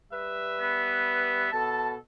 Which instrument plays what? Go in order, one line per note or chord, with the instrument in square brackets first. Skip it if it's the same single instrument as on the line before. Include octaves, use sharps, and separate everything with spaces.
[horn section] G3 B4 E5
[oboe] B3
[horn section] B2 A4 [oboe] A5